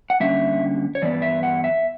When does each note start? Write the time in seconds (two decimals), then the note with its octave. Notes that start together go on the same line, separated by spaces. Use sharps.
0.10 F#5
0.20 D3 G3 A#3 C#4 E5
0.95 C#5
1.02 G2 E3 B3 D5
1.22 E5
1.43 F#5
1.64 E5